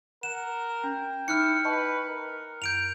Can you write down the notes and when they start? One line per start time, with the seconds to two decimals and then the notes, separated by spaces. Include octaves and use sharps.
0.23 A#4 F#5 E7
0.84 C#4 G5
1.28 D#4 E4 F6 F#6 C#7
1.65 B4 D#5 A5 C#6
2.08 A#4
2.62 F#2 G6 D7 F7